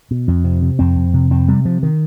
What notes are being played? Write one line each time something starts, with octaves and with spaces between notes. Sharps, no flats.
B2
F2
C3
C3
F2 C4
F2
C3
F2 C4
C3 G3
C3 F3
D#3